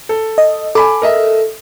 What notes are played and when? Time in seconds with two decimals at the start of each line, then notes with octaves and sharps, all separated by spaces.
0.09 A4
0.38 D#5
0.75 A4 G#5 B5 D6
1.02 A#4 D#5 E5